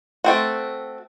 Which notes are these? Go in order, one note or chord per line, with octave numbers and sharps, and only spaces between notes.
A3 C4 F#4